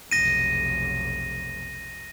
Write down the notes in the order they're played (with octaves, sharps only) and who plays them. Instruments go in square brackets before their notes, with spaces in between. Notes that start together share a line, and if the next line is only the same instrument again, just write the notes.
[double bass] F1 B1 [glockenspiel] A#6 D#7